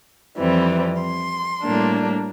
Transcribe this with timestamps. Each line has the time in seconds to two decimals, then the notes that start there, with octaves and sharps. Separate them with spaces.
0.37 F2 E3 G3 C4
1.01 C6
1.63 A2 G3 A#3 D4